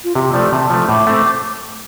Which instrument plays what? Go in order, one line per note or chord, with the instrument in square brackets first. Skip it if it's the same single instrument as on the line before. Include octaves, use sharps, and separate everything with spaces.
[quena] F4
[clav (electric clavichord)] C3 [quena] G4
[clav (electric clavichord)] F3 A3 [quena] D5
[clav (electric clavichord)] C3 [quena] A5
[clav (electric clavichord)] F3 A3
[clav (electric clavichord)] A2 [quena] D6
[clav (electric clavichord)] A3 C4